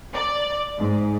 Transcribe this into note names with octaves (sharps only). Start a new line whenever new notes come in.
D5
G#2